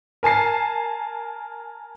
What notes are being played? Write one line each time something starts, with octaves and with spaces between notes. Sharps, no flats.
A#4 G#5 A5 C7